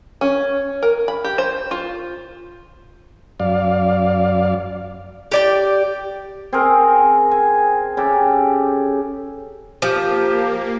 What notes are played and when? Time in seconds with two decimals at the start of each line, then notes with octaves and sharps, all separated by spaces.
0.21 C#4
0.83 A#4
1.08 B5
1.24 G4
1.38 C5
1.71 F4
3.40 F#2 D5 F5
5.32 G4 D5 G5
6.53 C4 G#4 A#4
7.31 G#5
7.97 C#3 G4 A4
9.82 F3 A#3 G4